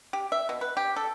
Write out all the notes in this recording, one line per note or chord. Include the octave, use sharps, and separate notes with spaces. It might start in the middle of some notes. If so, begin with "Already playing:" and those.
G4
E5
B2
B4
G4
A4